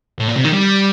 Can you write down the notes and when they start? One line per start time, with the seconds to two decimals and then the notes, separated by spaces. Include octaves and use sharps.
0.19 A2
0.28 A#2
0.36 C3
0.45 D#3
0.53 G3